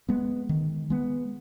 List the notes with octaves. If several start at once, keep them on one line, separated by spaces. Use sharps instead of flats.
G#3 B3
D#3
G#3 B3